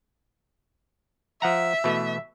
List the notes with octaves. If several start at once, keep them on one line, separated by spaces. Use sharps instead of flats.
F3 E5 F#5 A#5
B2 E3 A3